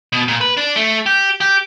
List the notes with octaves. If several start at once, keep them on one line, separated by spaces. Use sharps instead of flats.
B2
A#2
B4
D4
A3
G4
G4